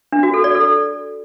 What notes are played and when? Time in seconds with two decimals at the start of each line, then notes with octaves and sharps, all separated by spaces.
0.12 D4
0.23 F#4
0.34 A4
0.44 D5
0.55 A4